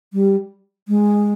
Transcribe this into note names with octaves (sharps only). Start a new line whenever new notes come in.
G3
G#3